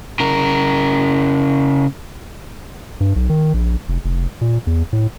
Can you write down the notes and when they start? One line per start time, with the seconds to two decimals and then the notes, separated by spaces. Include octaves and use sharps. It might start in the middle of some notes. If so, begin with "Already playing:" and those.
0.20 C#3 A#4
3.00 G2
3.16 B1
3.29 D#3
3.54 A#1
3.88 F1
4.05 F1
4.41 A#2
4.67 E2
4.93 A2